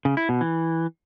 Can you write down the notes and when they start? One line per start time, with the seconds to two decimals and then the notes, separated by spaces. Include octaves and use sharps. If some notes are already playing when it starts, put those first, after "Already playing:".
0.05 C#3
0.17 E4
0.29 B2
0.41 E3